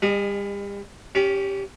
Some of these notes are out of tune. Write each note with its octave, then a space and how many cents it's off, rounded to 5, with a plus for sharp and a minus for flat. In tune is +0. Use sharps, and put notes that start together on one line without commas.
G3 +40 G#4 +20 D#5 -35
C#4 +10 G4 +0 D5 -45